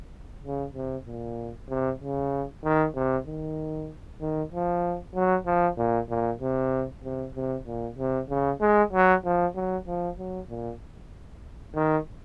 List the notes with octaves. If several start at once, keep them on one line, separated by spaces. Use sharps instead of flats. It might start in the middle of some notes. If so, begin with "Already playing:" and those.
C#3
C3
A#2
C3
C#3
D#3
C3
D#3
D#3
F3
F#3
F3
A#2
A#2
C3
C3
C3
A#2
C3
C#3
G#3
F#3
F3
F#3
F3
F#3
A#2
D#3